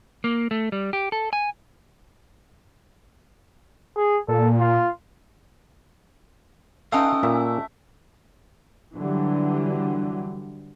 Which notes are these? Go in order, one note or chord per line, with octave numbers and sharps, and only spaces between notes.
A#3
A3
G3
G4
A4
G#5
G#4
A#2 A4
F4
A3 C#4 D#4 F5 G#5 D#6 E6
A#2 E5
D3 E3 F#3 G3